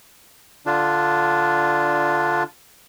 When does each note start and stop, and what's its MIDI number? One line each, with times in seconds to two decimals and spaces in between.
0.66 2.43 50
0.66 2.43 62
0.66 2.43 65